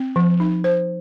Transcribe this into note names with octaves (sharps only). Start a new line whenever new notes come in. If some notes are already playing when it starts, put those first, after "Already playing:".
Already playing: C4
F3
D#4
C5